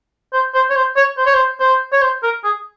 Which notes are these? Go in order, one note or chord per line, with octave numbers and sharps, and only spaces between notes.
C5
C5
C#5
C5
C#5
C5
C#5
C5
C5
C#5
C5
A#4
G#4